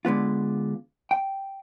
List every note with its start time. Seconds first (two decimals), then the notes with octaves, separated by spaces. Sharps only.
0.05 D3 G#3 B3 F4
1.11 G5